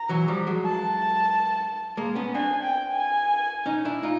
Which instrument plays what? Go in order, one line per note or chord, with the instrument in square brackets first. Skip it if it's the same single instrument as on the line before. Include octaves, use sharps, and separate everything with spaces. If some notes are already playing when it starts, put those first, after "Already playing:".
Already playing: [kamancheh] A#5
[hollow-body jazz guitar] E3 F#3
F3 G3
F#3 G#3
[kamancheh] A5
[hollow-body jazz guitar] G#3 A#3
B3 C#4
[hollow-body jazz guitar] C4 D4 [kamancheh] G#5
[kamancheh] G5
G#5
[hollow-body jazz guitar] C#4 D#4
D4 E4
D#4 F4